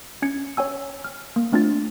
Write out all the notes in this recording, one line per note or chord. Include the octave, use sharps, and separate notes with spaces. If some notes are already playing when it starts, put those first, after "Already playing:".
C#4 G#6 C#7
C#5 G5 G#5 E6
F6
A#3
A3 C4 D4 F4 A6